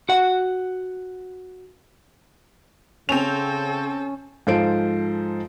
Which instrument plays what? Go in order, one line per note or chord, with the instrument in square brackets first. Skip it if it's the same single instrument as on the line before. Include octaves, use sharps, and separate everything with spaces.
[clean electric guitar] F#4 F#5
[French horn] C#3 [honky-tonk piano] C4 F7 [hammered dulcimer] C#4 [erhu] A4
[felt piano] G#2 F3 A4 C5 F5 D7